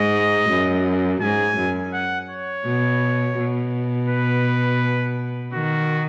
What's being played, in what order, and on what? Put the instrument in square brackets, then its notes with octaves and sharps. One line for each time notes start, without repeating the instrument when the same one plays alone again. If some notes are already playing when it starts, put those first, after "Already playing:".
Already playing: [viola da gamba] G#2 [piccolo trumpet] D#5
[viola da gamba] F#2
[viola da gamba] G#2 [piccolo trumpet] G#5
[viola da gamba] F#2
[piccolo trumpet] F#5
C#5
[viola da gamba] B2
B2
[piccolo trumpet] B4
[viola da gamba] D#3 [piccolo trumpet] F#4